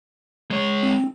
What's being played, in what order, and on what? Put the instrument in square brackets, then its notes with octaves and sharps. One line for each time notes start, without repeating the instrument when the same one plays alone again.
[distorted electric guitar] G#3 C#5
[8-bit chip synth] C4